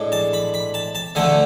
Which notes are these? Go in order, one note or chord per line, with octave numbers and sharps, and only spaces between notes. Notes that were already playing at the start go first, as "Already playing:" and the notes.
Already playing: A2 G#3 D4
A5
B5
B5
A5
A5
D2 D3 A3 G#5